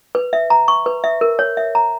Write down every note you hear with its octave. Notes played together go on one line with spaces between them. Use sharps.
B4
E5
A#5
C#6
B4
E5
A#4
C#5
E5
A#5